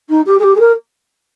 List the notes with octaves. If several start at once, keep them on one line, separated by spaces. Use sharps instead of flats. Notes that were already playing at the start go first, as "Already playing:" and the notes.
D#4
G4
G#4
G4
G#4
A#4